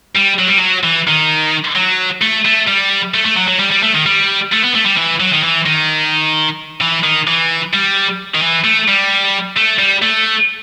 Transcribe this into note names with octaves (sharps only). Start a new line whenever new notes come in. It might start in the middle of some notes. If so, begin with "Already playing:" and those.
G3
F#3
G3
F#3
E3
D#3
F#3
A3
A3
G3
A3
A3
F#3
F#3
G3
G3
A3
D#3
G3
A3
B3
A3
G3
E3
F#3
D#3
E3
D#3
E3
D#3
E3
G3
D#3
E3
A3
G3
A3
G3
A3